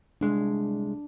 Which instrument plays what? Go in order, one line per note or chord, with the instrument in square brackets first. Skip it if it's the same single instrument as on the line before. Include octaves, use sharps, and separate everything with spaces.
[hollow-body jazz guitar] C2 G#3 [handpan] D4